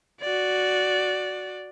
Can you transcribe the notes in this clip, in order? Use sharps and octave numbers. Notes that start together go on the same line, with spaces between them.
F#4 D5